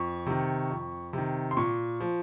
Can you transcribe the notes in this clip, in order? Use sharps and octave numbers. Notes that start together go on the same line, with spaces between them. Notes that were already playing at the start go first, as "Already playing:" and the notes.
Already playing: F2 C#6
C3 D#3
F2
C3 D#3
C6
A#2 C#6
F3